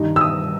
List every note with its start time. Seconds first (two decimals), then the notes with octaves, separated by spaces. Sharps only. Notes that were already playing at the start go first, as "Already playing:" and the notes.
Already playing: G2 D#3 G3 D#4
0.16 E6
0.21 D#6